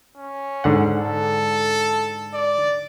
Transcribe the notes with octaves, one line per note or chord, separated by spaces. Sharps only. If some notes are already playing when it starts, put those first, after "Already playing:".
C#4
G#2 D3 F#5
A4
D5